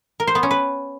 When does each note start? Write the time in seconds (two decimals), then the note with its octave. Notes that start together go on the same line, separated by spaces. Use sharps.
0.20 A#4
0.27 C5
0.35 B3
0.43 C#4
0.51 B4